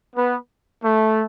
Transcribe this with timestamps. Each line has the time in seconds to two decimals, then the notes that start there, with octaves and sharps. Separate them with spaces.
0.15 B3
0.83 A3